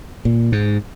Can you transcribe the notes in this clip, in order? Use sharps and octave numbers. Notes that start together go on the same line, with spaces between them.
A#2
G#2